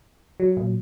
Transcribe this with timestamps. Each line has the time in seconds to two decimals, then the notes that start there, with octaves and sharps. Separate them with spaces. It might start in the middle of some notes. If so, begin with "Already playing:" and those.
0.40 F#3
0.57 A#2